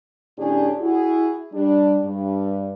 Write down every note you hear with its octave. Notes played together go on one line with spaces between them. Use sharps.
A2 D3 C#4 D4 G4 G#4
E4 F#4 G#4
G3 D4
G2